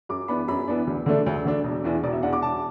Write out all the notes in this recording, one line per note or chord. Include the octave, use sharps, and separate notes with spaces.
F#2 D6
E3 B3 D4 B5
F#2 B5
E3 B3 D4
D2
D3 A3 D4
D2
D3 A3 D4
E1
E2 E3 D4
E1 D5
E5
E2 E3 D4 F#5
D6
E1 A5